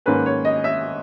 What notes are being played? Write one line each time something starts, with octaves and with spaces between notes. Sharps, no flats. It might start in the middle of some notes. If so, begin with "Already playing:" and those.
G#2 D#3 A#3 C#4 B4
C#5
D#5
E5